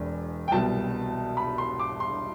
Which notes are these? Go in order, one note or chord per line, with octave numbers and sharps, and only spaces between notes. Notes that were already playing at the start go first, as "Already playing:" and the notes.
Already playing: E1 E2
G5
C2 B2 F#3 A5
B5
C6
D6
C6